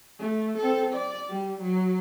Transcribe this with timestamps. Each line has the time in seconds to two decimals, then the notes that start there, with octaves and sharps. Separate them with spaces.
0.20 A3
0.58 C4 A4
0.93 D5
1.30 G3
1.62 F#3